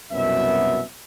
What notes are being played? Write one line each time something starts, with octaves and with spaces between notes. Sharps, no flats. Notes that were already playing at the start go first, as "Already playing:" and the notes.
C2 F#2 B2 B3 E5